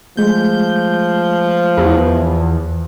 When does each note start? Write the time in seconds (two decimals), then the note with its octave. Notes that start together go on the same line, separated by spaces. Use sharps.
0.17 F3 G#3 A3 G6
1.77 E2